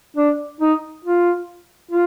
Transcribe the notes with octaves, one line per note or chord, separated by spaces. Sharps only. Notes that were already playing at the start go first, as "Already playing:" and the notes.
D4
D#4
F4
F4